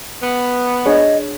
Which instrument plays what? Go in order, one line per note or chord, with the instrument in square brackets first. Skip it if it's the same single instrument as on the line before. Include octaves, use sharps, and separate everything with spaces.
[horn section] B3
[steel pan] D4 G#4 C#5 [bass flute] D#5